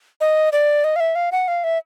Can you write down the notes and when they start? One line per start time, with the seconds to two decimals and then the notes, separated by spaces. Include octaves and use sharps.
0.21 D#5
0.52 D5
0.84 D#5
0.96 F5
1.00 E5
1.15 F5
1.32 F#5
1.48 F5
1.64 E5